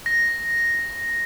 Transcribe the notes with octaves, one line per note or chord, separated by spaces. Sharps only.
A#6